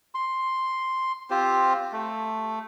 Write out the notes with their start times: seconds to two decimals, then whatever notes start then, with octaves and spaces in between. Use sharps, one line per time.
0.15 C6
1.30 C4 F4 G4 C5
1.92 A3